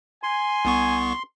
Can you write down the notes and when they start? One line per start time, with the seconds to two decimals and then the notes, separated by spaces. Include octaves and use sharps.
0.23 G#5 C6
0.65 C2 B3 C#6